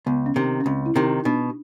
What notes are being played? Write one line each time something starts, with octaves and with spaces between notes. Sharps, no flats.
C#2 B3
C#4
C3 D#3
C#4
C#2 C4
E4
C3 D#3
D#4
B2 D4